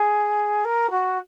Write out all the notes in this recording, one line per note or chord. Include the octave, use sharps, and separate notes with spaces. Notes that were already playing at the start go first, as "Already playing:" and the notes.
Already playing: G#4
A#4
F#4